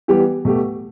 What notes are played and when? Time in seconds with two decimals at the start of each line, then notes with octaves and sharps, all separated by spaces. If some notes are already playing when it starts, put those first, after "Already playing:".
0.08 E3 G3 B3 G4
0.45 B2 A3 G4